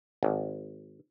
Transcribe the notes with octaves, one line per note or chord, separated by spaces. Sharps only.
G#1